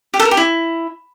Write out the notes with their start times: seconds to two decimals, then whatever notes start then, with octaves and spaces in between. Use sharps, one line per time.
0.14 G4
0.20 A4
0.25 A#4
0.31 G4
0.37 E4